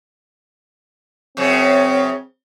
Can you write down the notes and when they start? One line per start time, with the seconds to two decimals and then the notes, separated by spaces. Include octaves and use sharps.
1.37 F#2 C#3 C4